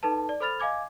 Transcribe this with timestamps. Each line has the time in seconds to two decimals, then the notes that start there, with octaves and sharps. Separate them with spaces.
0.03 D#4 A4 B4 A5
0.29 D5
0.40 A4 C5 B5 F6 A6 F7
0.60 D#5 F5 G#5 D6 G#6